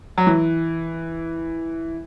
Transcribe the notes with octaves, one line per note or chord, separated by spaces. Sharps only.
F#3
E3